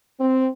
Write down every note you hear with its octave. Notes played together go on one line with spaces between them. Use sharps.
C4